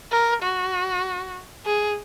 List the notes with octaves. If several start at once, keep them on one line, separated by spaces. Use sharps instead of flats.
A#4
F#4
G#4